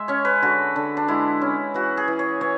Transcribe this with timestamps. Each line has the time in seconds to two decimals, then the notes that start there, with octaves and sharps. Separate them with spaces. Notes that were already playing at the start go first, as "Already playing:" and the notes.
Already playing: G#3 E5
0.08 C#4 C#5
0.25 B4
0.42 D3 F#4
0.76 D3
0.97 D4
1.08 G#3 E4
1.41 C#4
1.74 E3 F#4
1.97 G#4
2.08 E3
2.19 C#5
2.41 E3 C#5